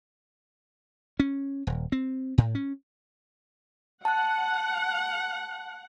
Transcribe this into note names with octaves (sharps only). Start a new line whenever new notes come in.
C#4
D#1
C4
A2
C#4
F#5 A5 F#6